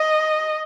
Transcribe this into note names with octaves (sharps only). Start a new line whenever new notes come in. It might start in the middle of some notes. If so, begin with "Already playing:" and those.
Already playing: D#5